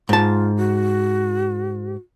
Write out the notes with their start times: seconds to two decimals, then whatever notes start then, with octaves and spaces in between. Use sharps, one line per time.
0.09 G#2 F4 A5
0.56 F#4